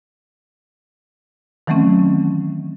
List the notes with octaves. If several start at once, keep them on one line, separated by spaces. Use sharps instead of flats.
D#3 E3 F#3 A3 C4 C#4